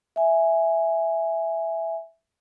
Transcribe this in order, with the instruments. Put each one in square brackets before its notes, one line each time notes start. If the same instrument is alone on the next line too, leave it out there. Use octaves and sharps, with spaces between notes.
[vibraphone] E5 G#5